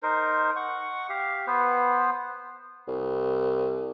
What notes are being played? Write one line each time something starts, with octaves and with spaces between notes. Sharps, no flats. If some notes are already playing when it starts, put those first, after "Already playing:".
D#4 A#4 C5
F#5 C#6
G4 F5
B3 B4 C5
C2